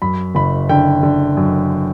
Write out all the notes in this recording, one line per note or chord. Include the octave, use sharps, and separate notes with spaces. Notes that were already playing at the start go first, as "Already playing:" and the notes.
F#2 B5
F#1 B5
D3 G5
D3
F#2